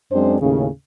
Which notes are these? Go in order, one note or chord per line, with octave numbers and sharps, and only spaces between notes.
F#2 G#3 C4 D4 C5
D#2 A2 C#3